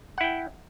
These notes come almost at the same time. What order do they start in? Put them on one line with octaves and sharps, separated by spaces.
F#5 E4 G5